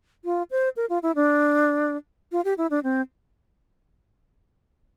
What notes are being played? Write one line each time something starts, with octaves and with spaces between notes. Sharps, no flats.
F4
C5
A#4
F4
E4
D4
F4
G4
E4
D4
C4